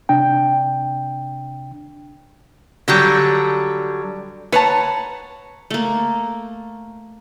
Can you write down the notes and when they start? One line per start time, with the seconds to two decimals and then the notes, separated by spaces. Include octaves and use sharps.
0.09 C3 D4 G5
2.88 D3 F#3 G3
4.52 B4 C#5 F#5 A5 A#5
5.70 A3 A#3